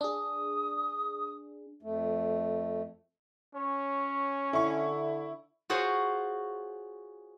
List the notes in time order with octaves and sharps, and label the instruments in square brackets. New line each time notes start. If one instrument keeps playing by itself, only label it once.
[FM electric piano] D4 G#4 [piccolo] D#6
[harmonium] F2 A3
[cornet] C#4 [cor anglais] C#5
[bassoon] D3 [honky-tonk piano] E4 C#6
[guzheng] F4 F#4 G#4 C5 C#5